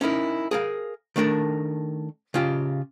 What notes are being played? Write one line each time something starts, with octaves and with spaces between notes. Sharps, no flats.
C#4 D#4 E4 A#4
G#4 A#4 F5
D#3 A3 D4 A#4
C#3 F4 G4